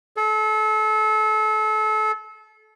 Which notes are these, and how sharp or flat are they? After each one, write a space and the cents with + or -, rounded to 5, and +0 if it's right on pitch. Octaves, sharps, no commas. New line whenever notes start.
A4 -30